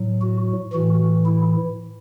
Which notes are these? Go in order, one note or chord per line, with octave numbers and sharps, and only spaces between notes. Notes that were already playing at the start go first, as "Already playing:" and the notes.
Already playing: A2 F#3
F#4
A2 E3 F#4
E4